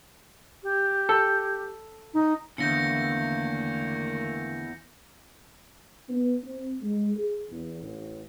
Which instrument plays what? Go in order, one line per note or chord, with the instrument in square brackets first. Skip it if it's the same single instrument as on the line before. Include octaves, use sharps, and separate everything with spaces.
[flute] G4
[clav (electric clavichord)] A4
[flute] D#4
[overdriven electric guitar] E2 [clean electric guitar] D3 [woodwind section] D#3 A3 A#3 [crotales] G6 A#6 C#7
[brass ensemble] B3
C4
G#3
G#4
E2
A1